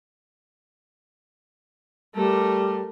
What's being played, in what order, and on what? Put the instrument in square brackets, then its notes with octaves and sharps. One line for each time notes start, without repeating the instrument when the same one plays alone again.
[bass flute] G3 [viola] A3 A#4